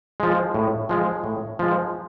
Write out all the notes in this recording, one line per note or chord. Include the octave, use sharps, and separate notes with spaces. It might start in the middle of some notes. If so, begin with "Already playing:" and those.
F3 G#3
A2
F3 G#3
A2
F3 G#3